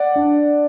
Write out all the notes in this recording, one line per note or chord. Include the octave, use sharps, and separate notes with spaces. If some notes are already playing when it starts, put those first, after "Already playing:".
Already playing: D5 F#5
D4